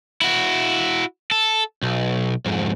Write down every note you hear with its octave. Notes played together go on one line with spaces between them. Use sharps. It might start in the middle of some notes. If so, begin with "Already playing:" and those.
E4 F#4
A4
B1
F2 G#2